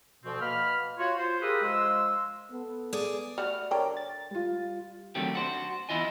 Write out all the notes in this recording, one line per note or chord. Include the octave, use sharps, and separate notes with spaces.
D2 B2 F3 C4
B2 A#3 B5 F6
F4 F#4 C#5
F4 C5
G4 G#4 A#4 B4 E5 D#6
F3 G#3 C6 E6
B3 A4
G#4 D5
G3 A3 F#4 F6
D3 D4 A#4 C#5 D5 G5
A6
G3 F4
D3 D#3 F#3 A3 C4 G4
D4 F#4 C5
E2 E4 F4 D#5 G#5